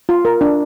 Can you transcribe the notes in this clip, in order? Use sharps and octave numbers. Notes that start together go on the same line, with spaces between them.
F4
A#4
D4